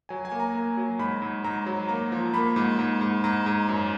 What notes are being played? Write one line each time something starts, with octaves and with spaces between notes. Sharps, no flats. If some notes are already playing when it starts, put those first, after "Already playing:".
F#3 G#5
G#5
A#3
A#5
A#3
F#3
G#2 B5
G#2
G#2 A#5
F#3
A#3 A#5
F3
A#3 B5
G#2
G#2
G#2
G#2 A#5
G#2
F#2